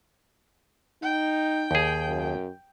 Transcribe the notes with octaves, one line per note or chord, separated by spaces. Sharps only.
D#4 G5
D#2 G#4
F#2